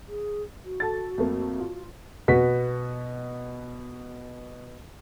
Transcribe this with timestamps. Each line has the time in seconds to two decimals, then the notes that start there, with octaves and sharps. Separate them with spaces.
0.09 G#4
0.65 F#4
0.80 A4 A6
1.18 F2 A3 A#3
1.60 F4
2.28 B2 B3 F#4 B6